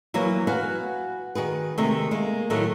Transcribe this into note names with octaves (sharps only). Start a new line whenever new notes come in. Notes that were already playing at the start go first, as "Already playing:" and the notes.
E3 F#3 A#3 A#4 C#5
F#4 B4 F5 F#5 G#5
D#3 F#4 G#4 B4
C3 D#3 G#3 A3
G#3 A#3
A2 D#3 F#3 A3 A#3